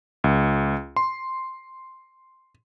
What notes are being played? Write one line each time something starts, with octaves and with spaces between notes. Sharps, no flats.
C#2
C6